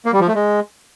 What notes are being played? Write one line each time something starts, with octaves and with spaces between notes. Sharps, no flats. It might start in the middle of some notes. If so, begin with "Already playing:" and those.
A#3
G3
F3
A3
G#3